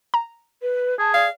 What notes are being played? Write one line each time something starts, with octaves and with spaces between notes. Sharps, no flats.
A#5
B4
G#4 A5
D5 F5